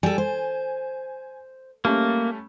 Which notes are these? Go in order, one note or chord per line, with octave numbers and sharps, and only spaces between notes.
G3 A4 G#5
C5
G3 A3 A#3 C#4